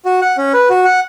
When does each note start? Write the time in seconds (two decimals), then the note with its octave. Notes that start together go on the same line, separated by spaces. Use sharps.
0.05 F#4
0.22 F#5
0.38 C#4
0.54 B4
0.70 F#4
0.85 F#5